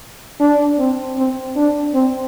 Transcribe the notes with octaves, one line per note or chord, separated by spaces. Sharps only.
D4
C4
C4
D4
C4